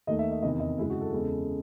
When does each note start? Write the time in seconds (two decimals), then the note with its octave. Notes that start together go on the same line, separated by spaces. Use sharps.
0.07 D#2 D#3 A3 D#5
0.19 E5
0.31 D#5
0.42 E2 C3 D#3 D#5
0.60 D#5
0.78 F#2 C#3 G#3 E4
0.90 F#4
1.01 A4
1.12 E2 C#3 G#3 A4